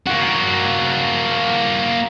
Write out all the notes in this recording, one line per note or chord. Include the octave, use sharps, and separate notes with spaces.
A#3 F#4